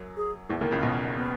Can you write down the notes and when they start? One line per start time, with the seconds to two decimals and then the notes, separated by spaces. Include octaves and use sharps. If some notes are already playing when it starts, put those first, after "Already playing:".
Already playing: F#2 F#3
0.17 G#4
0.49 E2 E3
0.61 D#2 D#3
0.71 C#2 C#3
0.82 B1 B2
1.16 B3